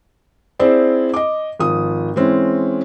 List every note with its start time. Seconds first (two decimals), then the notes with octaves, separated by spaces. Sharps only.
0.59 C4 E4 G#4 C5 D5
1.14 D#5 D6
1.60 G#1 F3 D#6
2.16 E3 G#3 C4 C#4